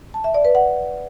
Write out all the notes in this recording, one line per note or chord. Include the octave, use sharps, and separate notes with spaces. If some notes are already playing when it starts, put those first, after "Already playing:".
A5
E5
D5
B4
F#5